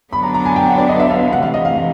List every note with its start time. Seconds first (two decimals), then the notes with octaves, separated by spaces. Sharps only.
0.13 D3 F#3 B3 D4 B5
0.23 A#5
0.34 A#5
0.45 G#5
0.56 G5
0.67 F#5
0.78 D5
0.89 D#5
1.00 E5
1.10 F5
1.21 F5
1.33 F#5
1.43 C3 E3 A3 F5
1.54 D#5
1.65 F5
1.75 F5